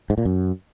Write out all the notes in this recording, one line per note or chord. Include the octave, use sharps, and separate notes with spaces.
G#2
A#2
F#2